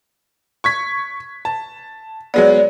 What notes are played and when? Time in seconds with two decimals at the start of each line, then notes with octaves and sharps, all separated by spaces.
0.64 C#6 G#6 B6
1.45 A5
2.34 F#3 G#3 B3 D5